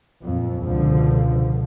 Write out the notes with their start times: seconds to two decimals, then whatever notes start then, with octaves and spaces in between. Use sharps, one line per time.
0.24 F2 A#2
0.63 C#2 B2 D3 F3